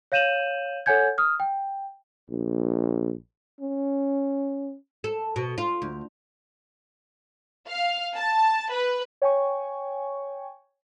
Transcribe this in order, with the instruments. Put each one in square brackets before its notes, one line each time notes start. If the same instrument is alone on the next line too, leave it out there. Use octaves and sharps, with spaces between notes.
[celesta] C#5 F5 G6 D#7 E7 F#7
A4 C#5 F#5 G#5 G6 G#6
D#6 F6
G5
[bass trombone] A#1
C#4
[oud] A4
B2
F4
D2
[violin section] F5
A5
B4
[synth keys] C#5 G5 G#5 C#6